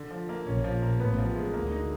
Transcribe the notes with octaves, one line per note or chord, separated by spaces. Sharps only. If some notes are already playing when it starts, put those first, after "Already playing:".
Already playing: D3
F3
A#3
A#1 A#2 C#4
F3
A#3
A1 A2 B3
F3
G#3
D2 D3 A#3
D#4